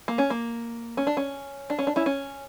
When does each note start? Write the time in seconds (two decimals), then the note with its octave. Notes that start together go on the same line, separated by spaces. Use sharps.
0.08 A#3
0.18 C#4
0.30 A#3
0.97 C#4
1.07 D4
1.17 C#4
1.70 D4
1.79 C#4
1.87 D4
1.96 C#4 E4
2.06 C#4